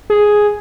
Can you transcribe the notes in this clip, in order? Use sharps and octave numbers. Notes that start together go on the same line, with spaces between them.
G#4